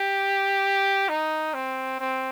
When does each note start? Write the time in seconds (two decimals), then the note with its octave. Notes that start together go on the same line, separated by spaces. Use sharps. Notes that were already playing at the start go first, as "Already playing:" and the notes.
Already playing: G4
1.09 D#4
1.54 C4
1.99 C4